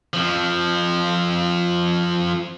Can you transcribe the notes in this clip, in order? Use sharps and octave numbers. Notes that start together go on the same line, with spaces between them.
F2 F3